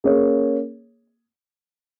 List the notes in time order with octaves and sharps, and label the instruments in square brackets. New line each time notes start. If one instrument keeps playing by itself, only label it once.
[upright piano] A#3 C#4 G#4 C#5